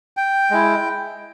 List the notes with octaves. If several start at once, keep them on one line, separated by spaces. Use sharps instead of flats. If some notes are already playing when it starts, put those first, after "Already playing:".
G5
G#3 E4